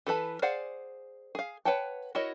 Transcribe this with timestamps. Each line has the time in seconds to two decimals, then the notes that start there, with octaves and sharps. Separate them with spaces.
0.07 E3 A4 B4 A5
0.42 G#4 C5 D5 F5 F#5
1.35 G#4 F5
1.65 B4 C#5 F#5 G5 A5
2.15 E4 F#4 A#4 C#5 D#5